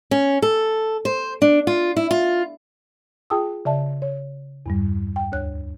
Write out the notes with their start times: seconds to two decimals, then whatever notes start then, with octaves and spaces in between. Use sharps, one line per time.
0.11 C#4
0.42 A4
1.05 C5
1.42 D4
1.67 F4
1.97 E4
2.11 F4
3.30 F4 G#4 G5 A5 D#6 E6
3.65 C#3 D5 E5 A5
4.02 C#5
4.66 E2 G2 G3
5.16 G5
5.32 D2 C#5 F#6